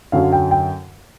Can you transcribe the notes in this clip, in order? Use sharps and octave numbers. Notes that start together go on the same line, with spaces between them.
F#2 D3 F#3 F5
G5
G5